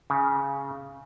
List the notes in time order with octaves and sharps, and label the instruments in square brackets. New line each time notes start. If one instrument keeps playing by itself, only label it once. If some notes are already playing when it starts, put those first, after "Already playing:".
[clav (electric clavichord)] C#3